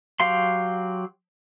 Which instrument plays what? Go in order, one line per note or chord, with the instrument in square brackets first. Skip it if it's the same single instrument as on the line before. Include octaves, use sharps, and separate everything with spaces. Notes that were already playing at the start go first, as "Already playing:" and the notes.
[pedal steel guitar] F#3 G4 F5 C6